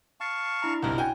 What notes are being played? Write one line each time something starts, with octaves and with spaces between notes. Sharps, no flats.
F5 A5 C#6
D4 E4 A#5
F#1 B1 C3 A#4
F#4 G5 G#5